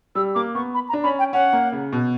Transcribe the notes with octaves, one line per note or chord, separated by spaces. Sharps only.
G3 E6
A#3 D6
B3 C#6
B5
A#5
D4
C#4 B5
G5
C#4 F#5
A#3
C#3
B2